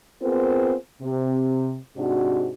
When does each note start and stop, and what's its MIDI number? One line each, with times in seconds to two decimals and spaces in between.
0.22 0.75 59
0.22 0.75 60
0.22 0.75 65
0.22 0.75 68
0.22 0.75 70
0.22 0.75 72
1.02 1.78 48
1.97 2.52 44
1.97 2.52 48
1.97 2.52 62
1.97 2.52 66